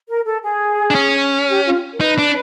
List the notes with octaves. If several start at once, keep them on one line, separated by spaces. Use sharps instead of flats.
A#4
A4
G#4
D4
C#4
G4
F4
A#4
D#4 B4
D4